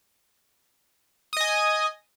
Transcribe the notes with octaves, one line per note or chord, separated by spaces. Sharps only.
D#5 G#5 D#6